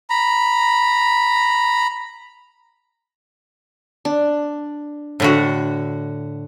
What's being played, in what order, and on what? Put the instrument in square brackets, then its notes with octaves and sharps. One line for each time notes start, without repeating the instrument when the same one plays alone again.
[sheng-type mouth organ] A#5 B5
[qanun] D4
[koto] A2 D3 F#4